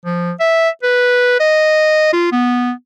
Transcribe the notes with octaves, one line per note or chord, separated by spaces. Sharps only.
F3
E5
B4
D#5
F4
B3